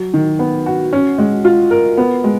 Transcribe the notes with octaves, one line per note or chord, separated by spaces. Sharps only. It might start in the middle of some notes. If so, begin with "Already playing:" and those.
Already playing: F#3
D#3
B3
F#4
C#4
G#3
F4
A#4
B3
G#3